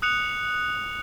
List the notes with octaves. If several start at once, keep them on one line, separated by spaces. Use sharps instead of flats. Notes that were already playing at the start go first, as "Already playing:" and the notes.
D#6 F#6 C#7 F7